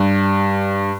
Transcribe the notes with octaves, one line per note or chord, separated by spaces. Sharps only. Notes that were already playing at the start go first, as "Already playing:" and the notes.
Already playing: G2